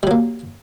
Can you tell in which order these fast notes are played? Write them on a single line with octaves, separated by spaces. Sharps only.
G3 F#3 A#3